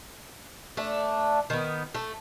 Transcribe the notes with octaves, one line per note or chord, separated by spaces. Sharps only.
A3 D4
D#3 B3
A3